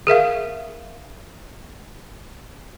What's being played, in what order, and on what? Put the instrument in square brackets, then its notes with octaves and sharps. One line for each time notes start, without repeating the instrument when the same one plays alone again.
[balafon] G#4 A#4 E5 F5